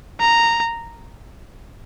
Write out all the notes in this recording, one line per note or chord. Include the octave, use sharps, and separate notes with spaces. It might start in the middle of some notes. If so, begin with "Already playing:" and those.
A#5